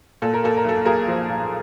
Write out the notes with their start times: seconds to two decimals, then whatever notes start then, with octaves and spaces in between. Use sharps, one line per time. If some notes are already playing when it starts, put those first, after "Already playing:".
0.22 A#2 A4
0.34 A#4
0.44 A#3 A4
0.57 A#4
0.64 B1 A4
0.85 B1 G#4 A#4
1.07 F3
1.29 A#2